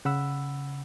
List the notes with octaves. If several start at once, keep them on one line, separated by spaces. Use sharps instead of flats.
C#3 F#5 B5 E6